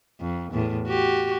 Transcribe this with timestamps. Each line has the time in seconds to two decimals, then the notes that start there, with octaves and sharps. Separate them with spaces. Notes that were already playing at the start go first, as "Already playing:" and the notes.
0.20 F2
0.52 E2 A2
0.87 F#4 G4